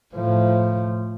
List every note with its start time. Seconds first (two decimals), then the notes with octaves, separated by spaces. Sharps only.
0.14 A2 F3